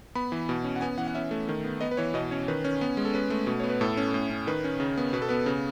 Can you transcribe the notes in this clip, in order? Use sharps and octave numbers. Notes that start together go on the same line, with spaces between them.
B3 B5
E3
B2
C#4
F#5
B3 G#5
E3 F#5
F#5
C#4 E5
A3
D#3
B3
B3 D#5
B4
E3 C#5
B2 D#5
C#4 C#5
D#3 B4
C#4
B3
G#3
A4
C#4 B4
A3
B2
B3 C#5
B4
A2 A4
C#4
A2
C#4
D#3 B4
C#4
C#3
B3
B2 B4
A4
B3 B4
C#3